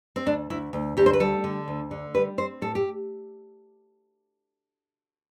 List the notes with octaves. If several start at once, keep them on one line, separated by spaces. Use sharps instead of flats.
C4
D2 D4
D2 E4
D2
D2 G4
C5
B4
G3 A4
D3
D2
D3
G3 B4
C4 C5
A2 A4
G4